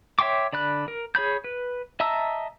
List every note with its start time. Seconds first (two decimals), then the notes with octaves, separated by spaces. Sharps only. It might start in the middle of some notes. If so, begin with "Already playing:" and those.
0.19 C#5 E5 G5 C6 D6
0.53 D3 D5 B5 F#6
0.88 A#4
1.15 G#4 C#5 B5 G6
1.44 B4
2.00 D#5 E5 A5 A#5 E6